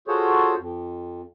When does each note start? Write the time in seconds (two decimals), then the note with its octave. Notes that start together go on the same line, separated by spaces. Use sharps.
0.08 F4 F#4 G#4 A4 C5 C#5
0.58 F2